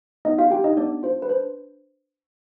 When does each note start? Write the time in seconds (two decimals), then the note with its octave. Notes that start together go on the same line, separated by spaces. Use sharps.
0.25 B3 D#4 D#5
0.38 F4 F5
0.51 D4 F4 G4 G5
0.64 D#4 D#5
0.77 B3 D4 D5
1.03 D4 F4 C5
1.22 B4
1.29 D4 C5